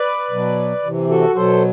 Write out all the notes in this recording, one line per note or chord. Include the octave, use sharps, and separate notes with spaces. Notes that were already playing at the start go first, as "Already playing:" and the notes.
Already playing: B4 D5
B2 F#3
C3 E3
F#4 A4
B2 F#3 A4 C5